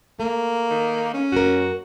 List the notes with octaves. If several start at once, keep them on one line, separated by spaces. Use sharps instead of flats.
A3 A#3
D#3
C#4
F#2 A#3 F#4 A#4